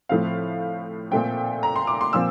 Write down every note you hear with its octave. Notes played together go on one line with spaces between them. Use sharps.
A2 F3 A3 C4 F5
A#2 A3 C4 G5
A#5
C6
D6
C6
A#2 F3 C4 E6